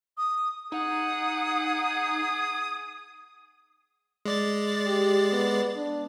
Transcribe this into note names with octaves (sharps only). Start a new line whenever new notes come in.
D#6
D#4 G#4 F#5 D#6
G#3 D5 A6
G4
B3
D4